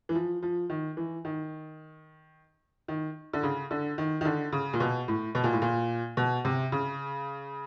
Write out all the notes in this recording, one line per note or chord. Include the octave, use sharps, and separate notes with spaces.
E3
F3
F3
D#3
E3
D#3
D#3
D3
C#3
D3
D#3
D#3
D3
C#3
A#2
B2
A2
B2
A#2
A2
A#2
B2
C3
C#3